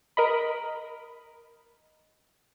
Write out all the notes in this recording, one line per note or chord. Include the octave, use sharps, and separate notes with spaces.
A#4 D#5 B5